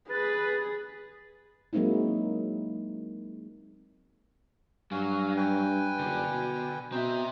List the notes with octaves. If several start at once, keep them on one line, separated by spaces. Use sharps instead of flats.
G#4 B4 A6
F#3 G#3 A#3 C4 D#4 E4
G2 F#3 F5 G#5
B4 G5 G#5
F#1 D3
B2
B2 C4 C5 D#5 E5 A#5